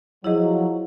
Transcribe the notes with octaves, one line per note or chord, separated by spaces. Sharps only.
F3 F#3 E4 G#4 D#5